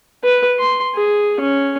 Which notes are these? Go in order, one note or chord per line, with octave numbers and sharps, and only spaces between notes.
B4
C6
G#4
C#4